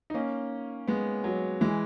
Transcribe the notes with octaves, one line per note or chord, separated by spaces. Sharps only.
D#4
A#3 C#4
G#3 B3
F#3
E3 G#3